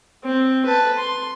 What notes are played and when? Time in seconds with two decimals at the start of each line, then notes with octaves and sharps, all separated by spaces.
0.25 C4
0.65 B4 A5
0.98 C6